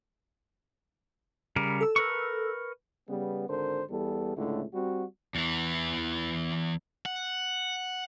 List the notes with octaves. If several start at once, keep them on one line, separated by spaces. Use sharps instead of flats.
C#3 G3 A#4
A4 E6
A#4 B4 C#6
C#3 G3 B3
G#1 D3 A#4 C5
E2 G3 B3 A4
C#2 A2 D3 A3
G3 C4 F#4
E2 E3
F#5